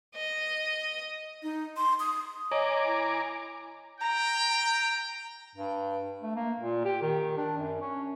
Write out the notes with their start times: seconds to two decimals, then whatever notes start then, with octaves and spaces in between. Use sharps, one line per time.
0.15 D#5
1.43 D#4
1.77 C6
2.00 D#6
2.51 C#5 D#5 G#5 A#5 D6
2.84 E4
4.01 G5 A#5
5.55 G2
6.22 A3
6.36 A#3
6.60 A#2
6.85 G4
7.01 D#3
7.37 D4
7.57 F#2
7.81 C#4